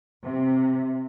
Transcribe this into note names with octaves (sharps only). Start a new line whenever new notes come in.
C3